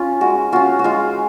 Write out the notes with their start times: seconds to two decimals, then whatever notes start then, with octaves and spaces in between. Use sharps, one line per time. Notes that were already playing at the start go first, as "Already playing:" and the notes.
Already playing: C#4 F4
0.21 G#3 F#4
0.52 C#4 F4 F#4
0.79 F#4
0.84 G#3 F4